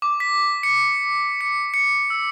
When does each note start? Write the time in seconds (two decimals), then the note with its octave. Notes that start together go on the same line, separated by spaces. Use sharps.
0.02 D6
0.20 B6
0.63 C#7
1.41 C#7
1.74 C#7
2.10 E6